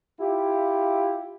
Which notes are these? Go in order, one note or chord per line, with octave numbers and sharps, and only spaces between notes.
E4 F4 G4